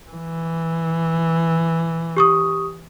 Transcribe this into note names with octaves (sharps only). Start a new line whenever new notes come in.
E3
G4 C#6 D#6